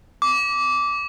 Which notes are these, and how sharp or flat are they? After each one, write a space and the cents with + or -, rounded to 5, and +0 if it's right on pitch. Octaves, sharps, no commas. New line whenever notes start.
D6 -15